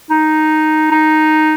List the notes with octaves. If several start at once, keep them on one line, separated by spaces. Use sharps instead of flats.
D#4
D#4